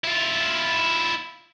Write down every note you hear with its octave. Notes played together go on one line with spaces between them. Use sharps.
E4 F4